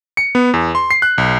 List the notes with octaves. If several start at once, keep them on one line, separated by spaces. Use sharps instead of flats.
C#7
B3
E2
C6
C7
F#6
B1